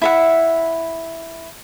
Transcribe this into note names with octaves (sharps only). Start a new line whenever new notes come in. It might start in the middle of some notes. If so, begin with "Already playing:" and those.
E4 E5 F#5